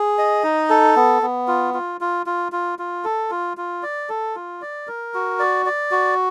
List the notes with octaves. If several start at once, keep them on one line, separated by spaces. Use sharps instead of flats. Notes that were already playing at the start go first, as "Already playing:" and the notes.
Already playing: G#4
D#5
D#4
A4
B3
B3
F4
F4
F4
F4
F4
F4
A4
F4
F4
D5
A4
F4
D5
A#4
F#4
D5
D5
F#4